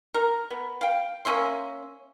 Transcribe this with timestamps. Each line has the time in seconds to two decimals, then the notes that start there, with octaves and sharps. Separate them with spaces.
0.14 A#4
0.50 B3
0.81 F5 G5
1.25 A#3 C#4 E5 C6